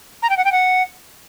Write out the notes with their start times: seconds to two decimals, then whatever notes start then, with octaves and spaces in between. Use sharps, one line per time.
0.23 A#5
0.30 G5
0.37 F#5
0.45 G5
0.52 F#5